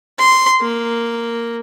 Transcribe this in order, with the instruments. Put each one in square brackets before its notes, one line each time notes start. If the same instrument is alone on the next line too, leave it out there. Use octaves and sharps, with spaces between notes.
[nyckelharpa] C6
A#3